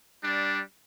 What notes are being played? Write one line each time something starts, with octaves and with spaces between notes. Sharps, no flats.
G3 D4